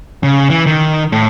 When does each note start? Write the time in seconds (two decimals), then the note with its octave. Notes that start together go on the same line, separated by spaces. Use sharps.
0.23 C#3
0.50 E3
0.66 D#3
1.12 A2